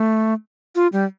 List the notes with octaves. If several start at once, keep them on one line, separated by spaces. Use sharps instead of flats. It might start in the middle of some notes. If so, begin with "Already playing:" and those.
Already playing: A3
F4
G3